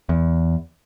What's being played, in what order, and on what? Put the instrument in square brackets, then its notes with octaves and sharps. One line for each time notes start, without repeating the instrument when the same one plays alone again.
[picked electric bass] E2